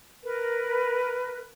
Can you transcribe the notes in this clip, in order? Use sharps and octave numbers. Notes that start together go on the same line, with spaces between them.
A#4 B4